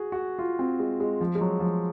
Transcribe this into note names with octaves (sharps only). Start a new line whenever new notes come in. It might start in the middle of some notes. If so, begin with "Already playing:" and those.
Already playing: F#4 G#4
F#4
F4
C4
G#3
G#3
F3
G#3
F#3
F3